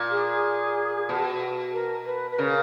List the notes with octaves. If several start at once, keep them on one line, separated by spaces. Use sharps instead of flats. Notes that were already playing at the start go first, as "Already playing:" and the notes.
Already playing: A#2
G#4
B2
A#4
B4
B4
C#3 A#4